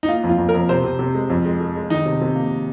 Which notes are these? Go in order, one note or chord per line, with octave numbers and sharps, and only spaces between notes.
D#4
A#3 F4
F2
F4
F2
A#4
F2
C3 C5
C3
C3
G#3
F2
G#3
G#3
G#3
D#3 D#4
C3
C3
A#3